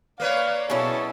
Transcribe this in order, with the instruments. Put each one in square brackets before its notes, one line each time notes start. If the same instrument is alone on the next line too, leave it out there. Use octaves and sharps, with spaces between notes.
[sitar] A#3 B4 C#5 [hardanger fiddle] D5 [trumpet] F5
[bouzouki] B2 F#3 C#4 [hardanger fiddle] E4 A4 [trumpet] G#4